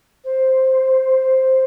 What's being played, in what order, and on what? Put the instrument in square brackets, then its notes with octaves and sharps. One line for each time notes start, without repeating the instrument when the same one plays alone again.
[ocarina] C5